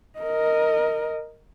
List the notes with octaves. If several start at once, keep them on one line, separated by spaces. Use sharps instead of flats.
A#4 D#5